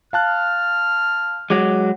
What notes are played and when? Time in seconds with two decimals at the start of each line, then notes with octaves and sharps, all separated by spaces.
0.13 F5 A5 F6 F#6
1.50 F#3 G#3 D6